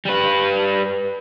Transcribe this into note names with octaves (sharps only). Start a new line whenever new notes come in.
G3 B4